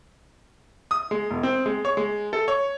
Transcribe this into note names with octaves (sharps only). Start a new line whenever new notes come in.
D#6
G#3
E1
C4
G#3
C#5
G#3
A4
C#5